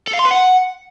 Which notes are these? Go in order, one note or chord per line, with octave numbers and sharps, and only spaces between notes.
A4
F5
C6
B4
F#5